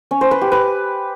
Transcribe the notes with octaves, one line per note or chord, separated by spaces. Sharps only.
C#4
C5
B4
G4
B4